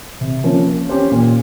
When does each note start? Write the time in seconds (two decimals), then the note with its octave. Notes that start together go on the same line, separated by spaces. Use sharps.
0.21 C3
0.43 F3 A#3 C#4
0.66 A#3
0.89 C#4 G4 C5
1.12 A#2